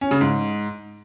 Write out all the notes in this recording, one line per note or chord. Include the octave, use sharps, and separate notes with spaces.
C#4
C#3
G#2